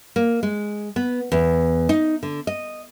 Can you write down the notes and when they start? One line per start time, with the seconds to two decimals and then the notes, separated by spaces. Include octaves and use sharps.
0.16 A#3
0.43 G#3
0.96 B3
1.32 E2
1.89 D#4
2.23 D3
2.47 D#5